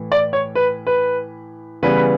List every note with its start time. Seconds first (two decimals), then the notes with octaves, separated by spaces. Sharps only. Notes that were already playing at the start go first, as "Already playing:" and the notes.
Already playing: A2 E3
0.12 D5
0.33 C#5
0.55 B4
0.87 B4
1.83 C#3 E3 G3 B3 B4